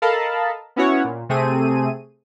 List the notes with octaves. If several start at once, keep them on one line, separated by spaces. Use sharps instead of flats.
A4 A#4 D#5 F5 A5 B5
B3 C#4 E4 F#4 C#5 F#5
A#2
C3 A3 C4 G#4 D#7